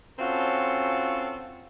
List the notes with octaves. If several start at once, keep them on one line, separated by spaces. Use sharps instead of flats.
C4 C#4 F4 F#4 A4